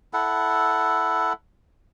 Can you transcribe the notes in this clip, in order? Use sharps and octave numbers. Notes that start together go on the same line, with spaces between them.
E4 A4 F#5